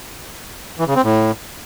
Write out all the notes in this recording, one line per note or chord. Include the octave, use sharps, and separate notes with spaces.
E3
C#3
C4
A2